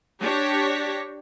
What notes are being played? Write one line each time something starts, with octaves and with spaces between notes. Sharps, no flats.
D4 G4 C#5 C#6 A#6 B6